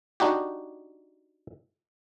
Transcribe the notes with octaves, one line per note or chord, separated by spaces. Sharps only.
D4 D#4 F#4 G4